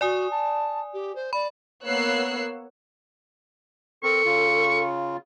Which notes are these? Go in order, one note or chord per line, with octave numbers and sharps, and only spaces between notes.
F#4 D5 G#5 D#6
A5
G4
C5
D5 B5
A#3 B3 C#5 E6 F#6 C7
C4 A4 A#4 C#6
C#3 F4